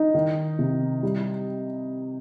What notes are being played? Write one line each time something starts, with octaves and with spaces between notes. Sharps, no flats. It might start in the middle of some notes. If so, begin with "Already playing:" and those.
Already playing: D#4
D#3
C3
G3